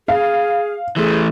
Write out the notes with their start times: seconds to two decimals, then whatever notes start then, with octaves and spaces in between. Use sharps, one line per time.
0.08 G#4 F5
0.96 E3 A3 G#4